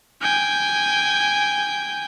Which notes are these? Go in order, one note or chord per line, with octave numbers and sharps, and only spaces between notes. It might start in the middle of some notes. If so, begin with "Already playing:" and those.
G5 G#5